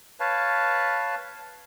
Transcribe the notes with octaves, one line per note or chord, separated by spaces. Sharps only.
B4 C#5 F5 A5